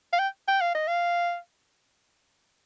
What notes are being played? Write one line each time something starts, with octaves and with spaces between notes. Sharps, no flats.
F5
G5
G5
F5
D#5
F5